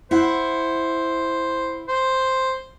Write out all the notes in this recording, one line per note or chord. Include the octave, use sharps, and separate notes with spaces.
E4 C5 F#5
C5